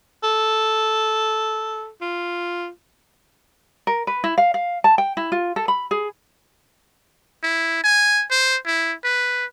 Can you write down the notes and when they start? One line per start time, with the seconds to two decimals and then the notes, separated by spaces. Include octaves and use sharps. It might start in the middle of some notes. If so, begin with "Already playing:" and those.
0.23 A4
2.02 F4
3.87 A#4
4.07 B4
4.24 E4
4.38 F5
4.54 F5
4.84 A5
4.98 G5
5.17 E4
5.32 F4
5.56 A4
5.68 B5
5.91 G#4
7.43 E4
7.84 G#5
8.31 C5
8.66 E4
9.04 B4